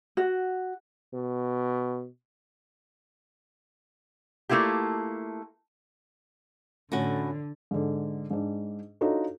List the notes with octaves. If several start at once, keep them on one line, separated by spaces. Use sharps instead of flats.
F#4
B2
A3 A#3 E4 F4 G4
A2 D3 C#4 F#4
G#2 D3
G#2 D4
D4 D#4 F4 F#4 A4 C#5